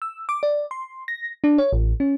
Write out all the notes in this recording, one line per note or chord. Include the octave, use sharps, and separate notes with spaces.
E6
D6
D5
C6
A#6
D4
C#5
A1
C#4